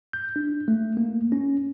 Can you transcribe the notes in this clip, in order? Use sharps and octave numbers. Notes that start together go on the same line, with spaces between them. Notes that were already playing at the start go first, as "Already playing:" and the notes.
G6
D4
A3
A#3
C#4